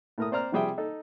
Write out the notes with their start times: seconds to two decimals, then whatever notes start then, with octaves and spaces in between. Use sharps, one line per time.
0.18 A2 A#4 D#6
0.31 C4 C5 D5 A#5 F6
0.52 C3 F3 G3 G#4 E5 G5
0.78 D#4 A4